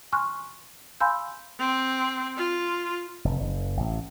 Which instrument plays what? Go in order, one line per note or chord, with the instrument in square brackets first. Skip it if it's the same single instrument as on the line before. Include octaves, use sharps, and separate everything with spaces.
[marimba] G#5 C6 C#6 F6 F#6
F5 G#5 B5 C6 E6 G6
[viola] C4
F4
[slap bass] F1
F#1
A1